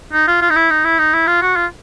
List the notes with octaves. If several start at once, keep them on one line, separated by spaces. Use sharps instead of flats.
D#4
F4
F4
D#4
E4
D#4
E4
D#4
E4
F4
F#4
F4